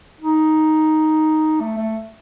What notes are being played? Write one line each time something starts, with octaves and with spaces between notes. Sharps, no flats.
D#4
A3
A3